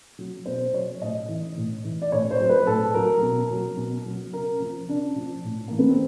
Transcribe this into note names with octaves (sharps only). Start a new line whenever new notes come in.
F#3
B2 C5
F#3 C#5
A2 D#5
E3
A2
E3
D5
A2 C#5
C5
F#3
B4
A2 A4
F#3 A#4
B2
F#3
B2
F#3
C#3 A#4
F3
C#3 D4
F3
A2
E3 A#3
B3
C4